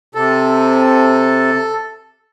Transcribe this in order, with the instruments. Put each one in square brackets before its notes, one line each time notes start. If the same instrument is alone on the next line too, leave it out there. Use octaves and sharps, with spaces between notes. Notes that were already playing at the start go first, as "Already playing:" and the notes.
[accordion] C3 [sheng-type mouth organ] A4